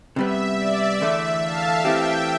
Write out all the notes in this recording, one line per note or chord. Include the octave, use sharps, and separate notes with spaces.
C3 G3 B3 E5
D5
E2 D3 A3 E5
F5 A5
E3 A3 C4 G4 E5 G5